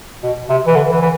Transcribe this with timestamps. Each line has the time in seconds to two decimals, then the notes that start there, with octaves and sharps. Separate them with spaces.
0.23 B2
0.49 C3
0.66 E3
0.75 D3
0.91 E3
1.01 E3